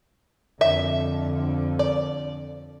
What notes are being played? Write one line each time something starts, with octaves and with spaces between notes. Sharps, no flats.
F2 D3 E5
D5